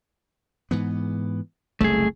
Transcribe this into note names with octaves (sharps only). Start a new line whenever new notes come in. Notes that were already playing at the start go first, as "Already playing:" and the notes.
G#2 E3 B3
F#1 C2 A3 G#4